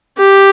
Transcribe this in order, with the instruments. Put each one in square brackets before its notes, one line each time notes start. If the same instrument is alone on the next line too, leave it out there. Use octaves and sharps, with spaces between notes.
[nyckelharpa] G4